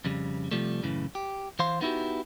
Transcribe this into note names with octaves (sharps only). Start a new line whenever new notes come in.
F2 C#3 G3
C3 F3 G3 A3
F#2 A2 C#3 E3
G4
E3 C5 F5 C6
B3 D#4 E4 F#4 G4